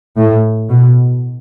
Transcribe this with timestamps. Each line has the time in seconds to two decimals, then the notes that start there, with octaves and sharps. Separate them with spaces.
0.17 A2
0.69 B2